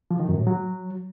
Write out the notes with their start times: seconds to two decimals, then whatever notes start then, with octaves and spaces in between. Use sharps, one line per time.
0.11 F3
0.20 D#3
0.29 F#2
0.38 A2
0.47 F#3